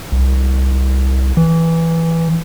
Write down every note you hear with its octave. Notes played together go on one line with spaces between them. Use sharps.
C2
E3